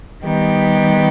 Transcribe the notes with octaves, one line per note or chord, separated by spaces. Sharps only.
D#3 G3 B3 D#4 G4